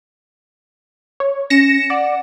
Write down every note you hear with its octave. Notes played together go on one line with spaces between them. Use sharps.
C#5
C#4 A#6 C#7 E7
D5 F#5